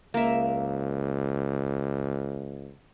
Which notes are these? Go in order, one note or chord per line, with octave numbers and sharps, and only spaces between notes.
C#2 A#3 E5